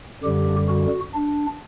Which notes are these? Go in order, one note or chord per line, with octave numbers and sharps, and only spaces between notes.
F#2 D3 G3 G4
F#4
D4